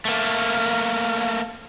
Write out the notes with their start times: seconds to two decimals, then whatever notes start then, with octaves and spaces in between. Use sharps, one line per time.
0.05 A3 A#3